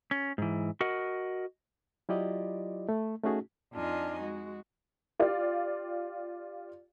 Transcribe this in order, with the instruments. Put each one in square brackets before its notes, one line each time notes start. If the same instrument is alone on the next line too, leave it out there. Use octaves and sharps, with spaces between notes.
[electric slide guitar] C#4
G#2 E3
F#4 A#4 D#5 F#5
[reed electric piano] F#3 E4 F4 G4 D5 D#5
A3
A3 C#4 D#4 F#4 G#4
[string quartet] F2 D4 D#4 F4 D#5 G#5
G#3 F#4
[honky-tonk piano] F4 G4 D5 F5